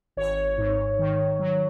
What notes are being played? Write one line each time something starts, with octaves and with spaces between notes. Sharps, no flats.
G#1 C#5
G#2
D#3
F#3